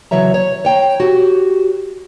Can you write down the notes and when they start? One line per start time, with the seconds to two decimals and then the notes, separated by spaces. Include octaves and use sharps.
0.11 C#3 E3 F#3 C#5 E5 A#5
0.34 C#5
0.65 C#5 G5 G#5 A#5
1.00 F#4 G4